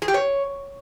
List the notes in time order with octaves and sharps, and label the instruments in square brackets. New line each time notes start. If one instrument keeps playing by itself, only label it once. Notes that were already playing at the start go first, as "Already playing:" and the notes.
[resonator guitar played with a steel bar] G#4
G4
C#5